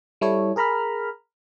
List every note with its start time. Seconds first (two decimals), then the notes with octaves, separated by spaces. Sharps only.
0.21 G3 E4 A4 C#5
0.56 G#4 A#4 A#5 B5 F6